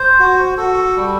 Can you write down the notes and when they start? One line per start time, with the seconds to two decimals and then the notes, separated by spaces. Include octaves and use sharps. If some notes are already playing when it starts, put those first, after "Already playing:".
Already playing: C5
0.20 F#4
0.57 F#4 A4
0.96 G3